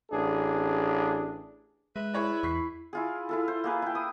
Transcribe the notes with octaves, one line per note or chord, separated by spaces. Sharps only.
A1 D4 G#4
G#3 B4 E5
E4 G#4 C#5 D5
E2 C#6 B6 C7
E4 F4 G#4
E4 F4 A4
C5
A#3 G#4 B4
E4 G5
D#6